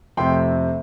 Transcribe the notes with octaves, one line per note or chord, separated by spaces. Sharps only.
F2 C3 A3 C4 G5 C6